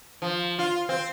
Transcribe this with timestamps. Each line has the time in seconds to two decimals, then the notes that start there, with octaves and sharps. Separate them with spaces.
0.22 F3
0.59 F4
0.89 C4